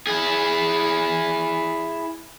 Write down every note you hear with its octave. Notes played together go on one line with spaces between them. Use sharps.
E4 G#4